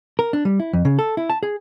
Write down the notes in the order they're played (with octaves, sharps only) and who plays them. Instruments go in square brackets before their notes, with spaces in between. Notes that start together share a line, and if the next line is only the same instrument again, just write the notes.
[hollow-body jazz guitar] A#4
D4
G3
E4
F2
C#3
A4
E4
A5
G#4